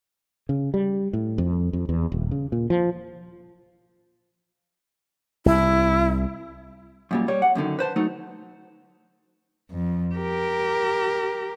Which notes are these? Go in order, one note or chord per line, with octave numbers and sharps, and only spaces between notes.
C#3
G3
A2
F2
F2
E2
D#1
C#3
A#2
F3
C2 E4
F#2 A#2 G3
G3 C#5
F#5
F#2 B2 D3 D#3
B4 C5 A5
F#3 A3 D#4
F2
G4 A#4